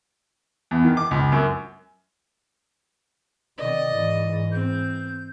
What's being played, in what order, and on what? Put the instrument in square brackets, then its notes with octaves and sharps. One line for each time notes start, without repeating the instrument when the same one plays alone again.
[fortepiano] E2
D#3
D6
C#2
F#2
[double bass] C3 D#3 [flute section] D5 [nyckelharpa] D#5
[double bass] G#2 E3
[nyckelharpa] C4 [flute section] G6